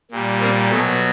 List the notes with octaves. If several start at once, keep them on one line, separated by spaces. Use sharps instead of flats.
A#2 G3
A#3 C4
B2 F#3 A3 B3